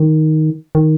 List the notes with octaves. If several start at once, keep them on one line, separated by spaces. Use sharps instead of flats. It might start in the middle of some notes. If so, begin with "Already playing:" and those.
Already playing: D#3
D#3